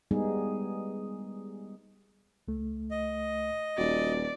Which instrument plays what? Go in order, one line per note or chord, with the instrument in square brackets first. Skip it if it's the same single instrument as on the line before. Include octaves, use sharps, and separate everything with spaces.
[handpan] G3 G#3 B3 D#4 G#4
[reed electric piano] C#2 A3
[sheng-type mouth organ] D#5
[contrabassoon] D#1 [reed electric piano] F#4 [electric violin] D5